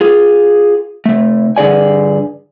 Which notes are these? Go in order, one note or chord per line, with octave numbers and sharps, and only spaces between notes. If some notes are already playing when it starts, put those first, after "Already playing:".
F4 G#4
C3 A3
G2 D3 G#4 D5 G#5